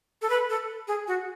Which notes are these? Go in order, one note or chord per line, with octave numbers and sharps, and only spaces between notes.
A4
B4
A4
G#4
F#4